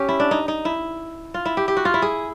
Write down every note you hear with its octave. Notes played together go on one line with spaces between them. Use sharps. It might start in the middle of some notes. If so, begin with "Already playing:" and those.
Already playing: C#4 G4
E4
D4
D#4
D#4
E4
F4
E4
G4
G4
F#4
F4
E4
G#4